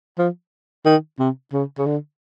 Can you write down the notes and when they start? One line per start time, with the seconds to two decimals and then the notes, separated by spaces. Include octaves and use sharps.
0.18 F3
0.86 D#3
1.19 C3
1.53 C#3
1.78 C#3
1.86 D3